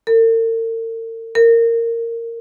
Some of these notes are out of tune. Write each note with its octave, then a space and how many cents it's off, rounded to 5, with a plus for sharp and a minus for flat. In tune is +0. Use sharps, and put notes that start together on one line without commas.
A#4 -45
A#4 -15